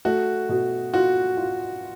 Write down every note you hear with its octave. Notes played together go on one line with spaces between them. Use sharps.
A3 F#4
B2
F4 F#4
F4